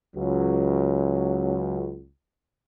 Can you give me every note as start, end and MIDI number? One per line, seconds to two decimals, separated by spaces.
0.14 2.08 37
0.14 2.08 54